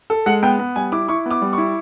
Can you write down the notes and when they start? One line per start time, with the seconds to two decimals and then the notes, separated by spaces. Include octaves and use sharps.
0.10 A4
0.26 G#3 F#5
0.43 B3 G5
0.59 B3
0.76 G3 G#5
0.92 E4 D6
1.08 E4 C#6
1.26 B3 D6
1.42 G3
1.53 C#6
1.58 E4